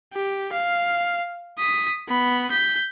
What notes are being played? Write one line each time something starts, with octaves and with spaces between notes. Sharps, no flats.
G4
F5
D#6 B6
B3 B5
G6 B6